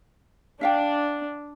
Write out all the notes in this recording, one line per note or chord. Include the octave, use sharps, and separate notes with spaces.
D4 E5 F5 G5